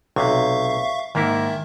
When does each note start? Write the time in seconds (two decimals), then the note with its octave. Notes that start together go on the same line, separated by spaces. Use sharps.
0.16 B1 C3 E5 F5 C#6
1.15 G#2 D#3 A#3 E4 E5